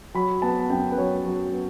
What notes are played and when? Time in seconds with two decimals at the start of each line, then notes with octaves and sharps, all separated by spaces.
0.14 F#3 B5
0.42 B3 A5
0.70 F#2 G5
0.92 B4
0.97 F#3 C#5
1.25 F#3
1.53 B3